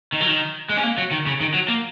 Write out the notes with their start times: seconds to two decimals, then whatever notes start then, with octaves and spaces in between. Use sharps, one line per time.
0.13 D#3
0.21 F#3
0.27 D#3
0.69 G#3
0.77 C#4
0.83 A#3
0.98 F#3
1.11 D#3
1.26 C#3
1.41 D#3
1.54 F#3
1.68 A#3